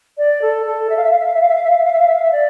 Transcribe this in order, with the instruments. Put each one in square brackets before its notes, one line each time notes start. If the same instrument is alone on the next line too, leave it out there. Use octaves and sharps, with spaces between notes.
[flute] D5
A4
A4
E5
F5
E5
F5
E5
F5
E5
F5
E5
F5
E5
F5
E5
F5
E5
F5
E5
F5
E5
D5